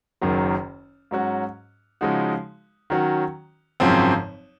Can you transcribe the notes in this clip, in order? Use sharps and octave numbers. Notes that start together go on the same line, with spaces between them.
F#1 F#2 D#3 F#3
G#2 F#3 C#4 F#4
C#3 F3 G#3 D#4 F#4
D#3 F#3 C#4 F#4
G#1 F#2 C#3 F3 C4